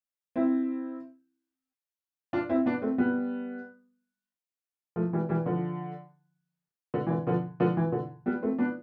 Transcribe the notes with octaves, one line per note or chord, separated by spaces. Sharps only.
C4 E4
D4 F4
C4 E4
B3 D4
A3 C4
G3 B3
F3 A3
E3 G3
E3 G3
D3 F3
D3
E3
D3
D3 F3
D3 F3
E3
D3
G3 B3
A3 C4
B3 D4